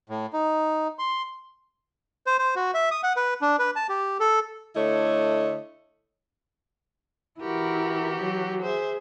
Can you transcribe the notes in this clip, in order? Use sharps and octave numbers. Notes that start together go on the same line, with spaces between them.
A2
D#4
C6
C5
C5
F#4
E5
D#6
F#5
B4
D4
B4
A5
G4
A4
D3 A3 E4 C#5 D#5
E3 E4 F#4 G4 A#4
F#3
G#4 C5 E5